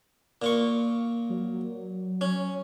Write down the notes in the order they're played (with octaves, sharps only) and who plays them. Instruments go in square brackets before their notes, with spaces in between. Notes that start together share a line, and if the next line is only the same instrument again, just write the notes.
[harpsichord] A#2 F4 C#6
[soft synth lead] F#3
[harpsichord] C#4